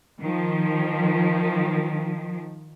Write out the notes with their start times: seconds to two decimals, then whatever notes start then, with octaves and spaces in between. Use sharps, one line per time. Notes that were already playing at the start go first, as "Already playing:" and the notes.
0.19 D#3 F3